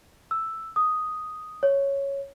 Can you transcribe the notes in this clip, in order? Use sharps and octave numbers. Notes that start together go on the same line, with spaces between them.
E6
D#6
C#5